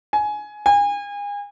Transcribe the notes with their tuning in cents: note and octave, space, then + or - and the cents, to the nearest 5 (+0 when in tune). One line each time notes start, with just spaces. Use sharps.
G#5 +15
G#5 -35